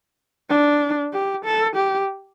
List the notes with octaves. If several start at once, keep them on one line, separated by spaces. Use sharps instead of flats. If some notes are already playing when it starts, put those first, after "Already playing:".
D4
G4
A4
G4